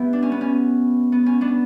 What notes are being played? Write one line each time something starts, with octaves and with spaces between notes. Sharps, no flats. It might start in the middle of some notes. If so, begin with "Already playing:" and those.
Already playing: B3 E4 G4 B4
D4
C#4
B3
C#4
B3
C#4
B3 D4